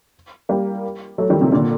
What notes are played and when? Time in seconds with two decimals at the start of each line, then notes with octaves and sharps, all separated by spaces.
0.49 G3 A#3
1.18 F#3 A3
1.30 D#3 G3
1.41 C3 D#3
1.52 A#2 D3